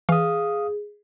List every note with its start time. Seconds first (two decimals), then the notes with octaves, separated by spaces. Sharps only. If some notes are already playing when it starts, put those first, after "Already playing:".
0.09 E3 G#4 F5 D#6